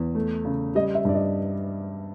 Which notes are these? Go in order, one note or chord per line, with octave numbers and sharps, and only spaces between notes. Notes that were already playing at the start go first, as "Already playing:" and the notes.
Already playing: E2
A3
C#3
G3 D#5
E5
G2 D5
D#5